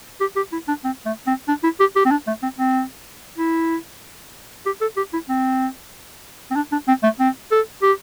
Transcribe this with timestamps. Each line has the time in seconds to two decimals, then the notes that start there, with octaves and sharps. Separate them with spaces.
0.20 G4
0.36 G4
0.53 E4
0.68 D4
0.84 C4
1.06 A3
1.27 C4
1.48 D4
1.64 E4
1.80 G4
1.96 G4
2.05 C4
2.11 D4
2.27 A3
2.43 C4
2.58 C4
3.38 E4
4.66 G4
4.81 A4
4.96 G4
5.13 E4
5.29 C4
6.51 C4
6.56 D4
6.72 D4
6.88 C4
7.03 A3
7.20 C4
7.51 A4
7.82 G4